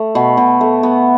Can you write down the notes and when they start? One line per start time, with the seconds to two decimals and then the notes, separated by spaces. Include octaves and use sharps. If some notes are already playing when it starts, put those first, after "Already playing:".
Already playing: A3
0.15 B2
0.37 B2
0.61 A3
0.83 B3